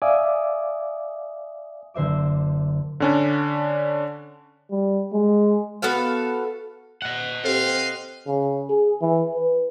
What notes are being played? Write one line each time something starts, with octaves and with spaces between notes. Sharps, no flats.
D5 E5 F5 G#5 D6 D#6
F#1 D3 C5 E5 D6
D3 C#4 D4
G3
G#3
B3 F#4 A4 F5
D#5 F#5
C4 G4 A4 F5
C#3
G#4
E3
B4